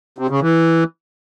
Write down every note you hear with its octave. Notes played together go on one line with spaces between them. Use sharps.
C3
C#3
E3